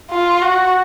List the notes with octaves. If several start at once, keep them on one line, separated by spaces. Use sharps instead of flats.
F4
F#4